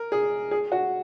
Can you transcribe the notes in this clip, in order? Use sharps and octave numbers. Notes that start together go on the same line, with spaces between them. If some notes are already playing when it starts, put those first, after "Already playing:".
Already playing: A#4
G#4
G#4
F#4